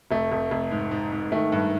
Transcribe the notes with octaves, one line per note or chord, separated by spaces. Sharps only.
F1 A3
F1
F1
G#2
G#2
G#2
D#3 A3
G2